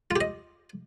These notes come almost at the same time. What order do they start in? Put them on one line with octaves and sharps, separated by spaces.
F4 G4 D#5